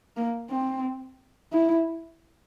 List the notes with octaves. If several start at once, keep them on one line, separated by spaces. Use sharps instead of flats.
A#3
C4
E4